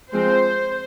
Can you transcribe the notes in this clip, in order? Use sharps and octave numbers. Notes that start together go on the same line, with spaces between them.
F3 G#3 C4 C5